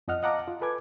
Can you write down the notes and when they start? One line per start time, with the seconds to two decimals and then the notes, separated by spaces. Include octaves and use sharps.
0.08 F2 F3 D#5 F#5 F6
0.23 D#5 F5 F#5 A5 A#5 D6
0.48 F4
0.61 A4 B4 G#5 D6 G#6